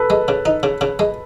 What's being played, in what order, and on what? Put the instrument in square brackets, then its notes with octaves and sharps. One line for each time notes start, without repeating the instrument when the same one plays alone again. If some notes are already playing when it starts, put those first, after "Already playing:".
Already playing: [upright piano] A4 B4
[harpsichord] G#3
C#3
D#4
C#3
C#3
G#3